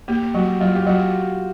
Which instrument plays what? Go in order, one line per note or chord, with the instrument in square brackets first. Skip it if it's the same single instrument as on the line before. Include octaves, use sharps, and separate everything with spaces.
[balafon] A#3 [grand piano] G4
[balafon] F#3 [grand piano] F#4
[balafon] F#3 [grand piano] F4
[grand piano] G4
[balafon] F#3 [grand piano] F#4